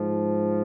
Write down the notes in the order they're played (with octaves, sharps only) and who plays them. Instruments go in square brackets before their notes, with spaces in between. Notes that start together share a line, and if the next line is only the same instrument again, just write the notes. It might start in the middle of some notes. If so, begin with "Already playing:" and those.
Already playing: [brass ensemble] G#2 F3